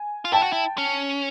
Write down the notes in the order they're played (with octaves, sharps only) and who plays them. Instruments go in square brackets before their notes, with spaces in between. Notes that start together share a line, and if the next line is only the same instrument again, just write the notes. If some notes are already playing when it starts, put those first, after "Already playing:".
Already playing: [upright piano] G#5
[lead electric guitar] F4
[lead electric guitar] E4 [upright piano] G5 A5
[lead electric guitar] F#4
E4
C#4